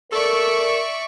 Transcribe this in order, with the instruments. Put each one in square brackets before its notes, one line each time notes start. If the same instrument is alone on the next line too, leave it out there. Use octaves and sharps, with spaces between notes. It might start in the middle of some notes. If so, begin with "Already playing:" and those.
[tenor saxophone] A4 [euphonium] A#4 [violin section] D5 E5 C#6